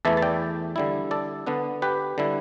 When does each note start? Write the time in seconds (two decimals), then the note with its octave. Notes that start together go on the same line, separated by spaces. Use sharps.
0.05 E2 E3 A3 E4 E5 A5
0.17 A5
0.22 D5 G5
0.76 D3 G3 E4
1.11 A4 D5
1.47 D3 B3 D4
1.82 G4 B4
2.18 D3 G3 E4